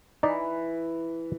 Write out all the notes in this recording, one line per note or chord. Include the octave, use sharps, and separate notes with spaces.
E3 D#4 D5